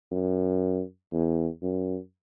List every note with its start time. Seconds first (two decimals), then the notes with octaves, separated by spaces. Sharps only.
0.11 F#2
1.12 E2
1.62 F#2